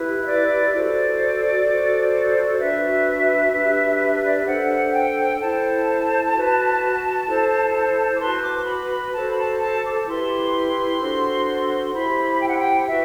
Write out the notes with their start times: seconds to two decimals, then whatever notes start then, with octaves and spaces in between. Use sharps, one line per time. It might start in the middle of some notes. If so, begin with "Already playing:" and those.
Already playing: E4 G4 B4
0.20 E5
0.25 D5
0.72 F#4 A4 C5 D5
1.66 F#4 A4 C5
2.59 D4 F#4 B4 E5
3.52 D4 G4 B4
4.23 D5
4.35 E5
4.46 D4 A4 C5 F#5
4.93 G5
5.39 E4 A4 C5 A5
6.33 F#4 B4
7.27 E4 A4 C5
8.15 D6
8.20 F#4 B4 C6
8.43 D6
8.66 B5
8.90 B5
9.13 F#4 A4 C5 A5
9.32 B5
9.37 A5
9.60 A5
9.84 D6
10.07 E4 G4 B4 C6
11.01 D4 F#4 A4 C5
11.93 E4 G4 C5 B5
12.41 G5
12.48 F#5
12.58 G5
12.87 F#4 B4 E5